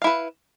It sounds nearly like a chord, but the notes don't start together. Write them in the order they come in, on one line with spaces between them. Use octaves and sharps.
F5 E4 B4